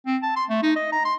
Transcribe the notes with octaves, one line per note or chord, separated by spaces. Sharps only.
C4
A5
C6
A3
D#4
D#5
A#5
C6